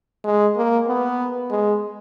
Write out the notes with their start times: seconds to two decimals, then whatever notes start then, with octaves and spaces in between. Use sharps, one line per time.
0.24 G#3
0.56 A#3
0.88 B3
1.51 G#3